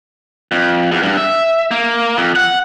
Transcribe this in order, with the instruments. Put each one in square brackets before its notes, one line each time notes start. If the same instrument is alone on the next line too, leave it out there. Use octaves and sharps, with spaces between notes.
[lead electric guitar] F2
E2
G2
E5
A#3
F2
F#5